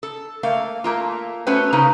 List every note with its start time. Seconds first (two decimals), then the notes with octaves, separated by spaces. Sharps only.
0.03 A4
0.43 A3 A#3 F5
0.84 A3 A#3 F4
1.47 A3 B3 C#4 F#4 B4 C5
1.73 C#3 A#3 D#4 B4